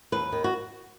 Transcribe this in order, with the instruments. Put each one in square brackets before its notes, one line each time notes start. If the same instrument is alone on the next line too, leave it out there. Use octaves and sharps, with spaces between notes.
[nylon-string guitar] D#2 B4
D#3
F#4